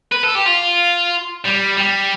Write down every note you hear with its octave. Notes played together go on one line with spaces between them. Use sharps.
B4
A4
G4
F4
G3
G3